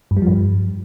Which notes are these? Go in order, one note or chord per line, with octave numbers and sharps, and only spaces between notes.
G2
G3
F3
G2